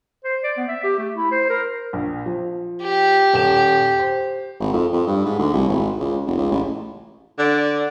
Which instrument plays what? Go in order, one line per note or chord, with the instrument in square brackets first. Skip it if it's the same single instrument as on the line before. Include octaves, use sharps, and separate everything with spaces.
[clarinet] C5
D5
B3
E5
G4
A3
E4
C5
A#4
[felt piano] A#1
F3
[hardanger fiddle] G4
[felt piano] D#1 G5 E7
C5
[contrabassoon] G#1
F2
F2
G2
G#2
D2
C2
G#1
C#2
F1
C#2
A1
[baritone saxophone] D3 [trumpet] D5